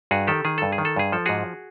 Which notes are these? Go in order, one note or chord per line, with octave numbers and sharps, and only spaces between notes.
G2 F#4 G#4
D#3 G4 A4
D#3 G#4
G2 A4
G#4
D#3
A4
G2 G#4
F3 A4
G#2 F#4 G#4